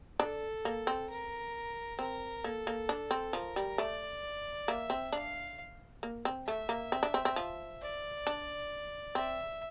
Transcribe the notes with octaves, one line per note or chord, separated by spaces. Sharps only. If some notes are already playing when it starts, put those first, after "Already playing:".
D4 A4
A#3
C4
A#4
C4 A#4
A#3 A4
A#3
D4
C4
F3 A#4
G3
A3 D5
A#3 E5
C4
D4 F5
A#3
C4
A3 E5
A#3
C4
D4
C4
C4
F3
D5
D4
C4 E5